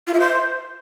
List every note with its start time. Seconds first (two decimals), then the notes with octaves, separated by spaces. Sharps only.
0.07 F4
0.13 E5
0.20 C5